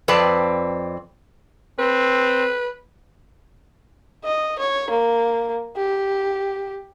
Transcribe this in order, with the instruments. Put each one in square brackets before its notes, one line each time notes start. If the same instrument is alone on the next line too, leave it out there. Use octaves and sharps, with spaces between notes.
[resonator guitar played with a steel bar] F2 C4 B4 D5 A5
[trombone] C4 [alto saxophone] B4
[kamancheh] D#5
C#5
A#3
G4